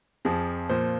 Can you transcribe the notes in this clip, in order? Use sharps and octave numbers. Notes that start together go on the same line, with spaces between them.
F2 F3 G#4
A#2 F3 C5